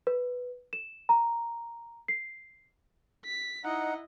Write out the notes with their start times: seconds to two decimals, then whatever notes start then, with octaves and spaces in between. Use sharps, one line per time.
0.07 B4
0.73 E7
1.09 A#5
2.08 C7
3.25 B6
3.64 D#4 E4 D#5 F#5